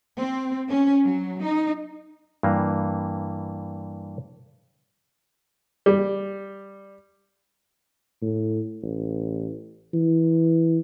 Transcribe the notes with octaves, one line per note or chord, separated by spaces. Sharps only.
C4
C#4
F#3
D#4
G2 E3 A#3
G3
A2
A1
E3